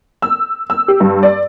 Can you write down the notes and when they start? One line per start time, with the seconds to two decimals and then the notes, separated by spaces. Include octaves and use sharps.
0.22 E6
0.70 E6
0.88 G4
1.00 G2
1.23 D5